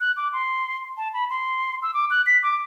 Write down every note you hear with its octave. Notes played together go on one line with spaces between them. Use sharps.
F#6
D6
C6
A5
B5
C6
E6
D6
F#6
B6
D6